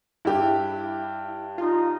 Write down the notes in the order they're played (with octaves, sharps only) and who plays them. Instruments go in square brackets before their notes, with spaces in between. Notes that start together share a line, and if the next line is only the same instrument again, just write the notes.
[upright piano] G2 G4 [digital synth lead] E4
[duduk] D#4 [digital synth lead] F4